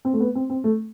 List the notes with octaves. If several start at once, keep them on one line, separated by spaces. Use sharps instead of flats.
C4
A3
B3
C4
C4
A3